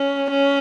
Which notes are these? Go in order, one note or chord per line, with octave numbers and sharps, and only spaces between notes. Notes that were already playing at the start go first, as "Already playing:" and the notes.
Already playing: C#4
C#4